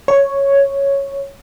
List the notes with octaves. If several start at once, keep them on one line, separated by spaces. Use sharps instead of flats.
C#5